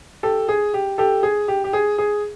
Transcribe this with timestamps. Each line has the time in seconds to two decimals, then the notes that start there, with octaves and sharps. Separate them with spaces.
0.23 G4 A4
0.48 G#4
0.74 G4
0.98 G4 A4
1.23 G#4
1.48 G4
1.64 G4
1.73 G#4
1.98 G#4